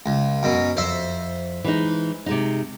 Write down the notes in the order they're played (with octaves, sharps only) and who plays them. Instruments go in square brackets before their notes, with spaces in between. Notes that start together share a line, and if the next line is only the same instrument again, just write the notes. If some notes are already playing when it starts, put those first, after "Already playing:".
[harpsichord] C#2
F#2 B2
[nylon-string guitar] F2 [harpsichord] C5 E5
[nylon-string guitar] E3 G#3 D#4
C3 G#3 D#4